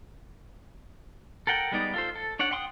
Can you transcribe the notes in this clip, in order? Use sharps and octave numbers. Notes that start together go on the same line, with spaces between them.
A4 A#4 F#5 G5
G3 G#3 B3 D#4 D5
F4 A4 C5
A4
D4 C#5 D5 F#5
F#5 G5 C6 D6 D#6